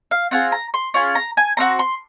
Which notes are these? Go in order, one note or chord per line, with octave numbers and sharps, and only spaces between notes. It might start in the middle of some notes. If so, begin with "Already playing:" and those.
F5
C4 F4 G#4 F#5
A#5
C6
C#4 F4 G#4
A#5
G#5
C4 D#4 F#4 A#5
C6